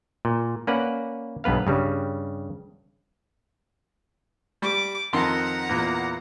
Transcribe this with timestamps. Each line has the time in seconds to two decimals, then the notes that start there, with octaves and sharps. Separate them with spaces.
0.25 A#2
0.67 A#3 C#4 B4 D5 F#5
1.44 B1 G2 B3 B4 F5
1.67 G2 C#3 G3
4.62 G3 D6
5.13 F2 D#3 F#5 A#5 C6
5.69 E2 A#2